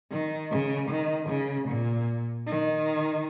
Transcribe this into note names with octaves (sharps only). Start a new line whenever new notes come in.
D#3
C#3
D#3
C#3
A#2
D#3